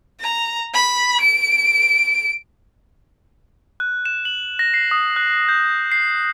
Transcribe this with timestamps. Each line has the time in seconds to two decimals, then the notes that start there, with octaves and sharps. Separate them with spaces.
0.21 A#5
0.74 B5
1.21 D7
3.80 F#6
4.05 E7
4.25 F#7
4.59 A#6
4.74 C7
4.91 D#6
5.16 F#6
5.49 G6
5.92 C7